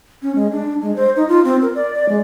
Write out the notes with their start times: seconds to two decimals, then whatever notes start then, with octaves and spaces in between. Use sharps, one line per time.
0.22 C#4
0.36 G#3
0.52 D4
0.82 G#3
0.96 C5
1.16 D#4
1.29 F4
1.45 C4
1.62 A#4
1.75 D5
1.94 D5
2.09 G#3